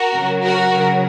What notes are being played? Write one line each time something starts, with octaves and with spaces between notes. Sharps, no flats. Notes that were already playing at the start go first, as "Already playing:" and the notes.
Already playing: F#4 A#4
C#3 F#3
F#4 A#4
C#3 F#3